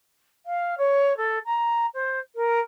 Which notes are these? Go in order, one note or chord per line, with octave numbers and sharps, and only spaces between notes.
F5
C#5
A4
A#5
C5
A#4